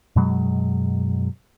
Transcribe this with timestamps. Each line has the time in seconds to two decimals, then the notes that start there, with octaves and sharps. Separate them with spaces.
0.16 F#2 B2 F#3 G#3